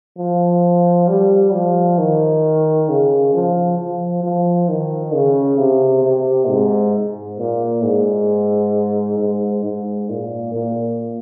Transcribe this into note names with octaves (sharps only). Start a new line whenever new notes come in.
F3
G3
F3
D#3
C#3
F3
F3
F3
D#3
C#3
C3
C3
G#2
A#2
G#2
G#2
G#2
A#2
A#2